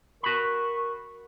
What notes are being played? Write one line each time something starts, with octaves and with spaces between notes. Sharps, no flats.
F#4 A#4 B5 C#6